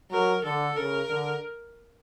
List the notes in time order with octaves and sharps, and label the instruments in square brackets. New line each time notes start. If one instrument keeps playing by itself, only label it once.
[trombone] F#3 [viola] A#4
[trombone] D3 [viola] A4
[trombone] C#3 [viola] A#4
[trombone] D3